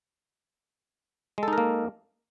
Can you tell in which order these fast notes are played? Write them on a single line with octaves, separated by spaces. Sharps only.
G#3 A4 D#4 A#4 A#3